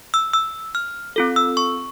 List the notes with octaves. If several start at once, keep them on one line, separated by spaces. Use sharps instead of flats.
E6
E6
F6
C4 F4 A4
E6
C#6